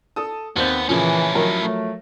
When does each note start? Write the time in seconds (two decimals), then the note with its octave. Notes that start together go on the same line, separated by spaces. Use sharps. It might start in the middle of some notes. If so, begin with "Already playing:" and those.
0.16 A4 A5 D#6
0.56 D#2 B3 C4 C5 G6
0.89 A#2 C#3 E3 F3 C#4 E4
1.35 D#3 F3 F#3 A#4
1.54 A3